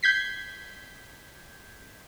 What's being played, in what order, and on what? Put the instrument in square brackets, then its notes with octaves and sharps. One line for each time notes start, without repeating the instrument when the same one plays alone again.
[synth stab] G6 G#6 B6 C7